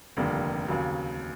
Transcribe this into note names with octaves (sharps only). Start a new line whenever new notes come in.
F1 D#2 D3 G3 A#3
D#2 C#3 F#3